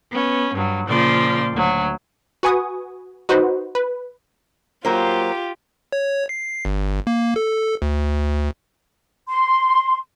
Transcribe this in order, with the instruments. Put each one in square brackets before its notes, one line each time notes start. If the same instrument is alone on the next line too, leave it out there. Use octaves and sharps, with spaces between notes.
[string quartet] B3 C#4
G2 F#3
A#2 C#3 F3 D5 C6
D2 F#3
[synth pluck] F#4 B4 G#5 C#6 D#6
D#4 F#4 B4 C5
B4
[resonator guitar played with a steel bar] F#3 A#3 C5 [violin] F4 G4
[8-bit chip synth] C#5
C7
G1
A#3
A4
D2
[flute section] C6